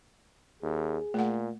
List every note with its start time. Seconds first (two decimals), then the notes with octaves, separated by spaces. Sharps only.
0.63 D#2 G#4
1.14 A#2 A3 F#5